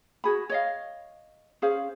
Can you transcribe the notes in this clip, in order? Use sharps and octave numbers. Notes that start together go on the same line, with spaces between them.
F#4 G#4 B5
C#5 D#5 F5
C#4 G#4 C5 F5